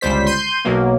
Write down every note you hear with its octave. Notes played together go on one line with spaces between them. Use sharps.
G1 C#2 G3 C5 B6
C6 G6 D#7
B1 B2 F#3 A#3